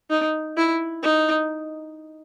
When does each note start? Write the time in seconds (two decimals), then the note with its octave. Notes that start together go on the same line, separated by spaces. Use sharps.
0.10 D#4
0.57 E4
1.03 D#4